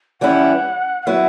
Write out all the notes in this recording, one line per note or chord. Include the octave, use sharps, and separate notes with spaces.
E3 G3 C#4 E4 F#5
F#5
F#3 B3 E4 E5